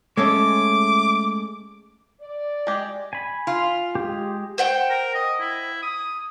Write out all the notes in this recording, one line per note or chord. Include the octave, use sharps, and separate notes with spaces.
G#3 A3 C#4 D6
D5
G#3 G4
G#5 B5
F4
G#3 G4
C5 F#5 G5
A#4
D#5
E4
D#6